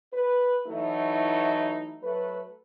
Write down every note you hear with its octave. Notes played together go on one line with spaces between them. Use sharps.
B4
E3 F#3 A3 D#4 E4
F#3 A3 B4